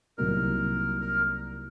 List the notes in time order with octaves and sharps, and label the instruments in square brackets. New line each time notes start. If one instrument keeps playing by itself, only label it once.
[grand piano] C2 C3 F#3 A#3 D#4 [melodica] A#4
[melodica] A#4